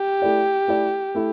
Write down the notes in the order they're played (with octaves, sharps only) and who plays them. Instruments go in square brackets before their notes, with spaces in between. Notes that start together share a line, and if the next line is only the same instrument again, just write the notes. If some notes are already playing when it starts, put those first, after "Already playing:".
Already playing: [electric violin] G4
[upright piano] A3 E4 A4 D5
A3 E4 A4 D5
A3 E4